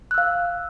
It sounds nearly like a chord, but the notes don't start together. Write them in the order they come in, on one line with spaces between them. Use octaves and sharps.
F#6 E6 F5